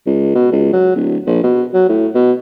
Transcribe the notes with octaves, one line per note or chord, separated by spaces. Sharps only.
C#2
B2
C#2
F#3
D1
A#1
B2
F#3
A2
B2